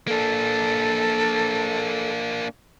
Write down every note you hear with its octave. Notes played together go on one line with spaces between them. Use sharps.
A#3 D4 A4